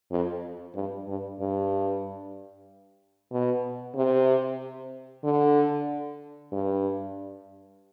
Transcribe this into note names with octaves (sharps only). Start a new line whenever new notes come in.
F2
G2
G2
G2
B2
C3
D3
G2